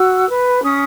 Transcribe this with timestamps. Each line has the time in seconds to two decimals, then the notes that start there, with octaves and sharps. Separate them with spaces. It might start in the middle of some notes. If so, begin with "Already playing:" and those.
Already playing: F#4 E6
0.28 B4
0.63 C#4 D#6